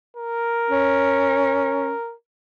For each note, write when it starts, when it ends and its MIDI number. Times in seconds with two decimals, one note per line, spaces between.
0.17 2.14 70
0.70 1.92 61